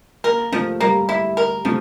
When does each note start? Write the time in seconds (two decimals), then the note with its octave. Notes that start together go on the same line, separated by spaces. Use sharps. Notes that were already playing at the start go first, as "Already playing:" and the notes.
0.24 A#3 A#4
0.52 F3 A3
0.80 G3 A#3
1.09 E4
1.37 A#4
1.65 F3 A3